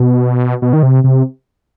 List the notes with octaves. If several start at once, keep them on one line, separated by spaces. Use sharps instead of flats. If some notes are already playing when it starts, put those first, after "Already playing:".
Already playing: B2
B2
D#3
C3
C3